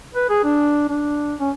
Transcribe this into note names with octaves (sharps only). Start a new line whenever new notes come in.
B4
G#4
D4
D4
C#4